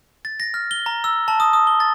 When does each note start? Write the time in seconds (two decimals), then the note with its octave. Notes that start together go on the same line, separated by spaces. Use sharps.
0.25 A6
0.40 A#6
0.54 F6
0.71 G7
0.86 A#5
1.04 E6
1.28 A5
1.40 D#6
1.53 D#6
1.67 G7
1.80 A6